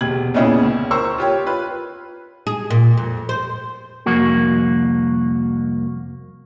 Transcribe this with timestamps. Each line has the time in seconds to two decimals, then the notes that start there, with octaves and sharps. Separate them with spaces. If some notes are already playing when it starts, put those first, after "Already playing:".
0.01 E1 C3 G#6 F#7
0.34 A#2 C#3 B3 C#4 E4 G#4
0.62 C#2
0.91 A#4 C5 C6 C#6 E6
1.18 F4 G4 C#5
1.46 F4 B4
2.47 G#4
2.70 A#2
2.97 F2
3.29 C5
4.06 C2 F2 A#3 F#4